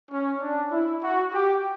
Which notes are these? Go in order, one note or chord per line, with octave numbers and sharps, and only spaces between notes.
C#4
D4
E4
F#4
G4